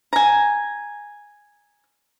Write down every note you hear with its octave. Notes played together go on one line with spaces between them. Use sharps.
G#5 A#5